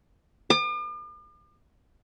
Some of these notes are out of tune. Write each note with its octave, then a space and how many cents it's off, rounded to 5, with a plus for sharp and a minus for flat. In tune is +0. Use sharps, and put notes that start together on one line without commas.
D6 +45